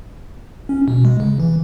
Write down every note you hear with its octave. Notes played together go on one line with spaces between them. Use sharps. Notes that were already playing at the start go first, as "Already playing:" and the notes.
C#4
B2
G#3
C#3
E3